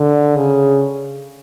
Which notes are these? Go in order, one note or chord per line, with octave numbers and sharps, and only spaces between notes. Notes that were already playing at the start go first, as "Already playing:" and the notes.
Already playing: D3
C#3